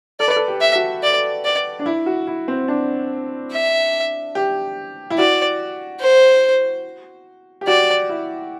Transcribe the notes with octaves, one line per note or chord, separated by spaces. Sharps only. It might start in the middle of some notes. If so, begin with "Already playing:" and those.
A4 D5
B4
A4
G4
E5
F#4
D5
D5
D4
E4
F#4
E4
C4
D4
E5
G4
E4
F#4 D5
C5
G4
F#4 D5
E4